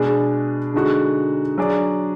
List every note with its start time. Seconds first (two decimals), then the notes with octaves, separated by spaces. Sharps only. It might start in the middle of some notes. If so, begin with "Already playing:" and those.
Already playing: B2 G#3 D4 G#4
0.74 D3 G#3 D#4 F#4
1.58 F#3 D4 G#4 D5